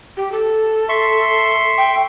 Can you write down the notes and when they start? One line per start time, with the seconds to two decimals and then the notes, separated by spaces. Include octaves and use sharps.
0.17 G4
0.32 A4
0.89 E5 C6 C#6
1.78 G5